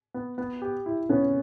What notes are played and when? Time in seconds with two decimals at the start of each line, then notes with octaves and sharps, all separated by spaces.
0.14 B3
0.38 B3
0.62 G4
0.86 E4
1.09 B3 C#4